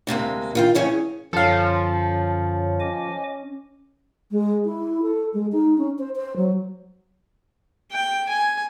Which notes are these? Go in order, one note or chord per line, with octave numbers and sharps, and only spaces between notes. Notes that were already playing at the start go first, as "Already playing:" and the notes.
D2 C3 G#3 A#3
D#3 F4 G5
E3 C#4 G#4 C#5
F#2 D3 F3 C#4 A4 F5
D#5 G#5 D6
G#3
E4
A4
G#3
D#4
C#4
C5
C5
F#3
G5
G#5